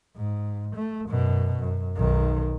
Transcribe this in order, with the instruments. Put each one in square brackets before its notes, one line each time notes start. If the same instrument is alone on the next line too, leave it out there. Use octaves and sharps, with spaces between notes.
[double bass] G#2
A3
F#2 B2
F#2
B1 D#3